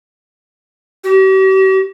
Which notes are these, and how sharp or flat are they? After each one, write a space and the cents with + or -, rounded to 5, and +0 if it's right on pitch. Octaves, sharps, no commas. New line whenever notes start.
G4 -45